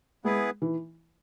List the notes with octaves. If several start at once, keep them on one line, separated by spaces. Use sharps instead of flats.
G#3 B3 E4 G#4 B4
E3